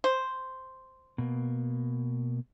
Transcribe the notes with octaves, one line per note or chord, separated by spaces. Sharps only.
C5
B2 A#3